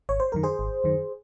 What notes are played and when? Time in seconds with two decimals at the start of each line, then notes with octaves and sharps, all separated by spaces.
0.09 G#1 C#5
0.20 C5
0.32 F#2 D#3 A#4
0.43 G#4 C5
0.59 G#1
0.84 F#2 D#3